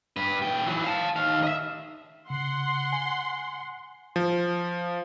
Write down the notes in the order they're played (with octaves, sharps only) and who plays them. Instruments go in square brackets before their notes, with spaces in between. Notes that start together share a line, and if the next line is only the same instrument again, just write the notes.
[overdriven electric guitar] G2 B4
A#2 G5
E3 F#3
F5 A5
D#3 F5
D#5 E5
[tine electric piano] C#3 [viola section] F#5 C6
[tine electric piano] G#5
[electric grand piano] F3